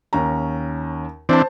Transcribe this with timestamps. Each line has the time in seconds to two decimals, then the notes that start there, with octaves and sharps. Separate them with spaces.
0.13 D#2 C#4 A#5
1.29 E3 C4 D4 C5 A5